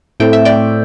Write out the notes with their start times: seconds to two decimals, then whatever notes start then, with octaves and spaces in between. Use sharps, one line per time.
0.20 A2 A3 C4 G5
0.33 E5
0.45 D5 G5